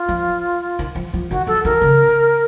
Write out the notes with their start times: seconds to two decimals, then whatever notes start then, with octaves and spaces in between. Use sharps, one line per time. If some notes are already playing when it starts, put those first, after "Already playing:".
Already playing: F4
0.09 F3
0.79 D#3
0.95 F3
1.14 F3
1.30 D#3 F#4
1.47 F3 A4
1.65 D#3 A#4
1.82 C#3